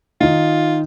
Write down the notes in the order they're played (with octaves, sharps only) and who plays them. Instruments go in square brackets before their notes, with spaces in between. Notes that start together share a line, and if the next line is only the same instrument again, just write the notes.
[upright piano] D#3 D#4 [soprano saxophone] F4